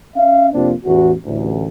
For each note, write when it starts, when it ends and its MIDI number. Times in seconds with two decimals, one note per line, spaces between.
0.16 0.48 61
0.16 0.48 76
0.16 0.48 77
0.53 0.72 41
0.53 0.72 48
0.53 0.72 58
0.53 0.72 60
0.53 0.72 62
0.53 0.72 65
0.85 1.11 33
0.85 1.11 40
0.85 1.11 66
1.25 1.66 33
1.25 1.66 38